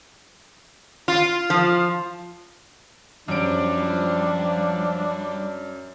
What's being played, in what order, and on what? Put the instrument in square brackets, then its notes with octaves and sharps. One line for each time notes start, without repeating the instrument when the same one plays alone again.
[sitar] F4
[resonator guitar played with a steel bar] F3
[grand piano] F#2 D7 [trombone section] F3 [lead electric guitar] G3 [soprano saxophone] D4